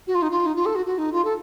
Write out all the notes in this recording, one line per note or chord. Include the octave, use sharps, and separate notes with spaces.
F#4
F4
D#4
F4
D#4
F4
A4
F#4
F#4
D#4
F4
A4